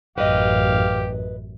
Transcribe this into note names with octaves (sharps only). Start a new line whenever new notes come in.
A1 F#2 G4 B4 D#5 F5